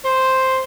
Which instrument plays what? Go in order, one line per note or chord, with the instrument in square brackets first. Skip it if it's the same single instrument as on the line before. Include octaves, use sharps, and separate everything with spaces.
[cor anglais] C5